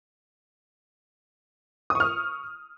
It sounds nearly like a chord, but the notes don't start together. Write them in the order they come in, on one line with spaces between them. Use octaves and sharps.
D#6 C#6 F6